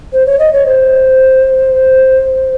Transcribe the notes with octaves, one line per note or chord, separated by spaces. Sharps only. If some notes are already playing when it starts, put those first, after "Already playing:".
C5
C#5
D#5
C#5
C5